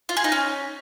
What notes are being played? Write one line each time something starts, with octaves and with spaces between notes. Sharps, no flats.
F4
G#4
D#4
C#4